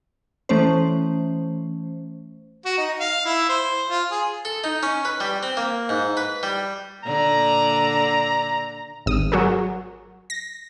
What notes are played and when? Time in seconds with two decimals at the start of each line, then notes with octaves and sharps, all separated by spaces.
0.49 E3 A3 C#4 C5
2.65 F#4
2.78 D#4
3.00 F5
3.25 E4
3.49 C5
3.89 F4
4.11 G#4
4.45 A4
4.64 D#4
4.83 C#4
5.05 B4
5.20 G3
5.43 C4
5.57 A#3
5.89 G#2
6.17 B4
6.43 G3
7.04 A#2 D3 D5 A#5
9.06 G#1 D#6
9.32 F#3 F#4 G#4 A#4
10.30 A#6